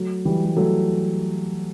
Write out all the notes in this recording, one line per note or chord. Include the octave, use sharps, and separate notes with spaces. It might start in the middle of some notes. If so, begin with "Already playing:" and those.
Already playing: F#3 A3
E3 G3
G3
F#3 A3